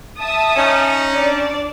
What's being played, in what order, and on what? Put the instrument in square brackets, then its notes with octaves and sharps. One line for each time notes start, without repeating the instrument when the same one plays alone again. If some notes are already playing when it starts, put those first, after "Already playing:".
[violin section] E5 A5 D#6
[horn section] C#4 D#4
[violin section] D4 D5